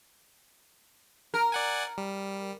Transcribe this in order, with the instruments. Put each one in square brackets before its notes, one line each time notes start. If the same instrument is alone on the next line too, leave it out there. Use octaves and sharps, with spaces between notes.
[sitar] A#4
[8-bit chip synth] D5 F#5 G#5
G3